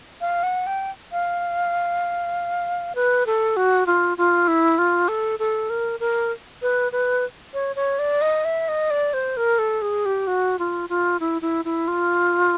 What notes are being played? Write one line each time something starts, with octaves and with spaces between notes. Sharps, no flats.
F5
F#5
G5
F5
B4
A4
F#4
F4
F4
E4
F4
A4
A4
A#4
A#4
B4
B4
C#5
C#5
D5
D#5
E5
D#5
D5
C5
A#4
A4
G#4
G4
F#4
F4
F4
E4
E4
E4
F4